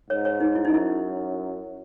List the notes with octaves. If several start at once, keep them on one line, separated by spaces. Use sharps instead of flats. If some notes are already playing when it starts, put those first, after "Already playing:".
G#2 C#5
C#5
D#4
E4
D#4
F#2 E4